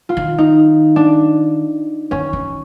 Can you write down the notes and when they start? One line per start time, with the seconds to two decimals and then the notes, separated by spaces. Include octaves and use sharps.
0.09 F4
0.17 D#3
0.38 D#4
0.96 D4
2.11 D#3 C#4
2.33 D#3